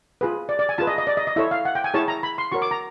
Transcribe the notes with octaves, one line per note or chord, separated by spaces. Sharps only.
F4 G#4 B4
D5
D5
G#5
F4 G#4 B4 A5
D#5
D#5
D5
D#5
D#5
E4 A4 C#5 E5
F5
F#5
G5
G#5
E4 G#4 C#5 A5
A#5
B5
C6
F#4 A#4 C#5 C#6
D6
A#5